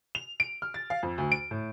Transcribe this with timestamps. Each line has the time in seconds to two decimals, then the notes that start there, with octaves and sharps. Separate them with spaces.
0.15 F7
0.40 D7
0.62 F6
0.74 A6
0.90 F5
1.03 F2
1.18 D2
1.32 D7
1.51 A2